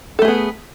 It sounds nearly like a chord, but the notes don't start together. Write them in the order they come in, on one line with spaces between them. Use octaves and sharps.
A4 A3 G#4 B3